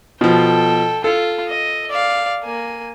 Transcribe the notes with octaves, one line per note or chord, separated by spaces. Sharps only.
B2 F3 A4 G5
F4 A4
D#5
D5 F5
A#3 G#5